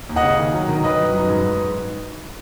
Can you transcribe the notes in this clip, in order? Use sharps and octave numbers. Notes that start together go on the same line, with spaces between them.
D#2
D#5 F#5
C#3
D#3
F#3
D#3
D#3 B4 D#5
F#2
F#2
G#2
G#2